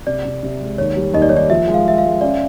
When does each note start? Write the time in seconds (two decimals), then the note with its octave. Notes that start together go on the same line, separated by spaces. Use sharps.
0.07 C3 D5
0.25 C3
0.43 C3
0.61 G#3
0.78 D#2 C#5
0.96 G3
1.14 D#2 D#5
1.22 D5
1.29 C#5
1.32 D#2 D5
1.50 F3 E5
1.67 G#3
1.74 F5
1.86 G#3 E5
1.98 F5
2.04 G#3
2.21 C#4 D5